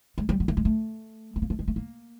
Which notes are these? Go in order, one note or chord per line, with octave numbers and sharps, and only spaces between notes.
G#3
G3
F#3
A3
G#3
A3
A3
A#3
A3
G#3
A3
A#3